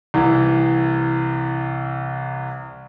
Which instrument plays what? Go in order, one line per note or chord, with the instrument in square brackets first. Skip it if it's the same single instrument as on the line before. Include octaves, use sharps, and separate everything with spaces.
[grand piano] C2 E3